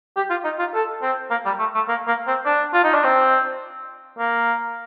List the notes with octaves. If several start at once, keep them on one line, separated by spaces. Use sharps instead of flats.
G4
F4
D#4
F4
A4
C4
A#3
G3
A3
A3
A#3
A#3
C4
D4
F4
D#4
D4
C4
A#3